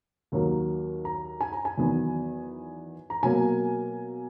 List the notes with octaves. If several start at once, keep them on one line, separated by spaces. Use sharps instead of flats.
D#2 D#3 F#3 A#3
A#5
G#5
A#5
G#5
E2 D#3 F#3 B3
A#5
B2 F#3 A#3 G#5